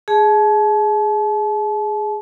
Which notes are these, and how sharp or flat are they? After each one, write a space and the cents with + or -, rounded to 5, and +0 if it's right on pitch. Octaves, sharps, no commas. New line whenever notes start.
G#4 +0 A5 -35